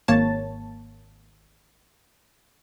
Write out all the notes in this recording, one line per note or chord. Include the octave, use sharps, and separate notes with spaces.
G#1 A#3 C#5 A5 A6